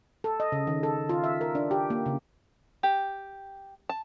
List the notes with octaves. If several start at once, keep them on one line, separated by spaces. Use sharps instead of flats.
A4
D#5
C#3
D#3
A4
F4
E5
A#4
D4
G4
A#3
C#3
G4
A5